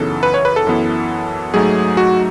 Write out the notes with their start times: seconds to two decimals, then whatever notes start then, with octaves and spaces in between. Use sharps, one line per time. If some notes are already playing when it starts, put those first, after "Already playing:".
Already playing: F#2 C#3 E3 B3 D#4 A4
0.23 B4
0.34 C#5
0.45 B4
0.56 A4
0.67 F#2 E3 B3 E4
1.53 G#2 F#3 A3 D#4 G#4
1.97 F#4